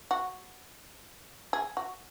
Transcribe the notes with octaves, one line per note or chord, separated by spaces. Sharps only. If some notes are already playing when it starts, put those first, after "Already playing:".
F#4
G#4
F#4